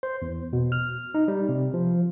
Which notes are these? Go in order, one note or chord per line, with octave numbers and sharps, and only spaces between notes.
C5
E2
B2
F6
D#4
G3
C3
F3